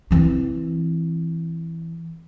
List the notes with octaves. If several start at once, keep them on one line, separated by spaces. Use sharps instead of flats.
E3 C4